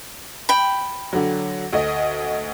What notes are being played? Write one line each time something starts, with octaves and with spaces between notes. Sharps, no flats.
G5 B5
D3 F#3
D2 A3 D#5